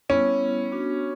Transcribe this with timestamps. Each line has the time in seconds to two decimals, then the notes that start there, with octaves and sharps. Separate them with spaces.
0.09 G3 B3 C#4 E4
0.72 B3 D4 F#4